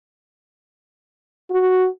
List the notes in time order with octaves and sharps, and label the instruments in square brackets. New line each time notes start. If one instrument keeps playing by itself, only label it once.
[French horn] F#4